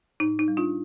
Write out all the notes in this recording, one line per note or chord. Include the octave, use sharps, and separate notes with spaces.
A2 D#4
D#4
G3
D4 F4